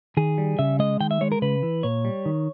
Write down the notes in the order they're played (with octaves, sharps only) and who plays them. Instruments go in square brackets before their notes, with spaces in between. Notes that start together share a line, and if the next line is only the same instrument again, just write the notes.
[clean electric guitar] D#3 G#4
G3
C#3 E5
G#3 D#5
D#3 G5
E5
G#3 C#5
A#4
C#3 B4
E3
A#2 C#5
G3
D#3